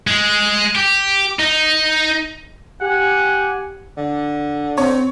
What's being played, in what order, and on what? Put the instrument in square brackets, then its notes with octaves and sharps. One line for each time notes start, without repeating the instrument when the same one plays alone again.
[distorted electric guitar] G#3
G4
D#4
[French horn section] G4 [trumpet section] F#5 G#5
[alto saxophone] D3
[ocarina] C4 [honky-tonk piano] C#5